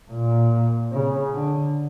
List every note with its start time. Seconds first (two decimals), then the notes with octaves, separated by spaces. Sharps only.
0.11 A#2
0.93 C#3
1.33 D3